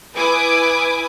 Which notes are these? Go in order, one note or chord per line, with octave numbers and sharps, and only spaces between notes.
E4 B4 G#5 D6 D#6